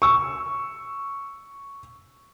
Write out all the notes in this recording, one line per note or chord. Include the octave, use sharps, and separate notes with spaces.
C#6 E6